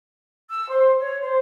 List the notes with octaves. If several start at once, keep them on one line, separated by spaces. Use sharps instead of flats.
E6
C5
C#5
C5